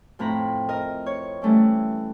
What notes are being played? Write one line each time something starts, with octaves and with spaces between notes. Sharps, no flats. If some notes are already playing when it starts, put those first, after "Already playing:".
F2 A2 C4 A#5 B5
A#4 D#5
C#5
E3 G3 A3 C#4 E4